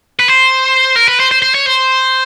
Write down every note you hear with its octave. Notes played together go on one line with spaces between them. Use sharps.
B4
C5
A#4
B4
C5
C5
C5
C#5
C5